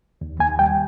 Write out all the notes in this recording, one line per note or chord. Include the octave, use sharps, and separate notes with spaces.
D#2
D#2 G#5
G3 G5